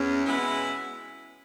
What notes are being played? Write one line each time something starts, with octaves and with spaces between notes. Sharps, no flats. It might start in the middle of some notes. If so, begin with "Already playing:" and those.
Already playing: E2 C#4
B2 G#3 B3 E4